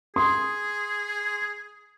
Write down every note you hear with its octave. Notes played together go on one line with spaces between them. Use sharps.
G#4 C6 D#6